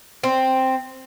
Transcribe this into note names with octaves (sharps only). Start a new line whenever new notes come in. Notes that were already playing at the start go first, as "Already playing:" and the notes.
C4